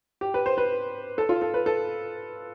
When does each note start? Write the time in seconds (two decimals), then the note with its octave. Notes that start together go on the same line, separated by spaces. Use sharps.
0.21 G4
0.34 B4
0.46 C5
0.58 B4
1.18 A4
1.29 F4
1.42 A4
1.54 B4
1.66 A4